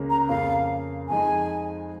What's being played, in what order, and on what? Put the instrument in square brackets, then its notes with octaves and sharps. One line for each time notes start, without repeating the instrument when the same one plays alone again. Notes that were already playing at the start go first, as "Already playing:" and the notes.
Already playing: [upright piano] C#2 C#3 A#3 C#4 A#4
[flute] A#5
[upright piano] F2 C#3 A#3 [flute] F5
[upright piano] F2 F3 G#3 D#4 G#4 [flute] G#5